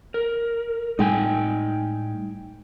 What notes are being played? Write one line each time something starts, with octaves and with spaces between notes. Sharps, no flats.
A#4
A2 G3 G#3 D#4 G5 G#5